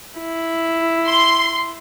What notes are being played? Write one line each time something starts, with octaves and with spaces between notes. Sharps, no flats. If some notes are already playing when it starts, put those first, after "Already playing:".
E4
C6